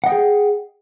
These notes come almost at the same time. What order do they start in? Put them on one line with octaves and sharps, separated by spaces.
F#5 D#5 G5 G#4